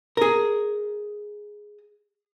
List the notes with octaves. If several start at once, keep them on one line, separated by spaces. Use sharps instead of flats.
G#4 A#4